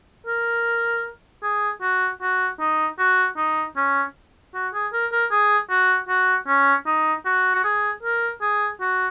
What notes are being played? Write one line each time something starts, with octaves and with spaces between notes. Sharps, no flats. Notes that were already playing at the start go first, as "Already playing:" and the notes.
A#4
G#4
F#4
F#4
D#4
F#4
D#4
C#4
F#4
G#4
A#4
A#4
G#4
F#4
F#4
C#4
D#4
F#4
F#4
G#4
A#4
G#4
F#4